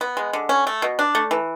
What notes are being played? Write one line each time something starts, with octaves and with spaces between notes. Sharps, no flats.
B3
G#3
D3
C#4
A3
B2
D4
A3
E3